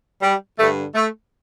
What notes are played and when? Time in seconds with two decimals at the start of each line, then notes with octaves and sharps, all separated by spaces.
0.22 G3
0.58 G2 D3 A3
0.95 A3